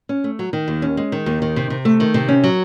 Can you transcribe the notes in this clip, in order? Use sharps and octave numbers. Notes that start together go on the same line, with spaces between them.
C#4
A3
F#3
D#3
D#2
C#4
G#3
D#3
D#2
D#3
C3
C3
A3
D#3
C3
C#4
F#3